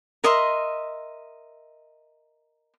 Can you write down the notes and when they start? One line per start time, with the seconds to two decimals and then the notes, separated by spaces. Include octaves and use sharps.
0.24 A#4 D#5 E5 C6